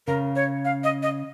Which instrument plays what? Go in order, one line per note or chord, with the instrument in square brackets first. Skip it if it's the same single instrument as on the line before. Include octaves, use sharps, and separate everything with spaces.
[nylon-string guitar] C#3 [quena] A#4
[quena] C#5
F5
D#5
D#5